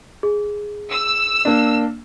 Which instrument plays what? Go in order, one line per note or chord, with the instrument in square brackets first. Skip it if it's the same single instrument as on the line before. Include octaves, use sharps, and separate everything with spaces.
[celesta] G#4
[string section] E6
[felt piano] A#3 D4